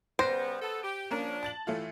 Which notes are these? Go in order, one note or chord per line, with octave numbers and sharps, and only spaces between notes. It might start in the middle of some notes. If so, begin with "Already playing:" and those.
C#3 G3 B3 C5 G6 A#6 D7
B3 A4
G4
F3 A#3 C#4 D4 A#4
A5 A6 F#7
A2 E3 A3 F4